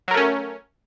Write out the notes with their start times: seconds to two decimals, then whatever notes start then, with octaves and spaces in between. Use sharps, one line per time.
0.08 F#3
0.11 A#4
0.14 A3
0.17 C#4